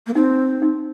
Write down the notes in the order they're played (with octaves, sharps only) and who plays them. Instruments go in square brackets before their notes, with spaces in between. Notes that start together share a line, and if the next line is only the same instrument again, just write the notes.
[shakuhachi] A#3
[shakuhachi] C4 [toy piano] D#4
[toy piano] D#4